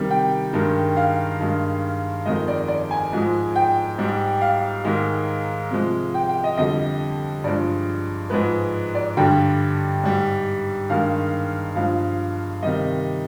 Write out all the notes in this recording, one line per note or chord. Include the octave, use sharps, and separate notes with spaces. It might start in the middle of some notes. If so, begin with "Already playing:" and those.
Already playing: C3 D#3 G3
G5
G2 D#3 G#3
F5
G2 D#3 G#3
F2 D#3 G#3 D#5
D5
D5
G#5
G#2 F3 G#3
G5
G#2 G3
F5
G#2 D#3 G#3
C3 F3 G#3
G5
G5
D#5
F2 D3 G3 D#5
G2 F3 G#3 D5
G#2 F3 G#3 B4
D5
G2 D3 G3 G5
G#2 G3
G2 D#3 G#3 F5
G2 F3 G#3 F5
C3 D#3 G3 D#5